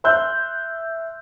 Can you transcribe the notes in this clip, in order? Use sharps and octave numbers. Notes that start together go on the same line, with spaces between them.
E5 C6 E6 F#6 G6